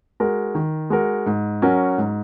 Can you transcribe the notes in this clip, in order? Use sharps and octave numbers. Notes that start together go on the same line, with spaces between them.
G#3 F#4 A#4
D#3
G#3 F#4 A#4
G#2
F#3 C#4 F#4 A#4
G#2